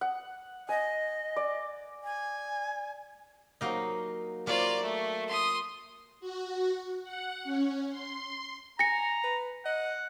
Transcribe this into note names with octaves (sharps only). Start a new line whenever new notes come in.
F#5
D#5 G#5
D5
G#5
F#3 A#3 D#4
A#3 F4 C#5 D5
A3
C6 D#6
F#4
F#5
C#4
C6
G#5 A#5 A#6 C#7
B4
D#5 F#5